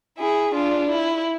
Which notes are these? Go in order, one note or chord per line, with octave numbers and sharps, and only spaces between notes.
E4 G#4
D4 F4
E4